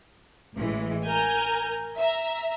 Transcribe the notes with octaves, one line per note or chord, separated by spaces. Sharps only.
A1 A2 E3 G#3
A#4 G#5 A#5 F6 G6
E5 A#5